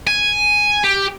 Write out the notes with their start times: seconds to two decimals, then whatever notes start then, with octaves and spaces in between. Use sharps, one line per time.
0.07 G#5
0.84 G4